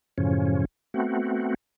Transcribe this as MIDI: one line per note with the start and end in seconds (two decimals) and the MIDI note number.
0.18 0.65 42
0.18 0.65 45
0.18 0.65 49
0.18 0.65 53
0.18 0.65 61
0.94 1.54 57
0.94 1.54 59
0.94 1.54 60
0.94 1.54 66